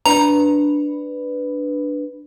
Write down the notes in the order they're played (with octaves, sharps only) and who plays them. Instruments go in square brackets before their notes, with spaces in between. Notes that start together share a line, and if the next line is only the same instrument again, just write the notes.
[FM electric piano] D4 B4 [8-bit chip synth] A#5